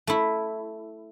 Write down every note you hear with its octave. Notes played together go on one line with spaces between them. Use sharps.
A3 E4